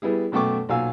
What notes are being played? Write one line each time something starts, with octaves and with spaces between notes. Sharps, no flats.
G3 B3 E4 G#4
F#2 B2 A3 G5 C#6 D6
B1 A#2 F#3 F5 G#5 E6